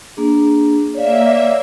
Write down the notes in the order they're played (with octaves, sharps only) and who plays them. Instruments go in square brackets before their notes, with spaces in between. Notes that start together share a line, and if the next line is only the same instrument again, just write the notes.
[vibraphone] A#3 D4 G#4
[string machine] A#3 E5 [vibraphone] C#5 D5 F5